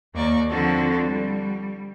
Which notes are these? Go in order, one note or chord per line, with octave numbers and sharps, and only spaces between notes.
D#2 A#3 D5 C#6
D3 F3 C4 F4 F#4 A4
G3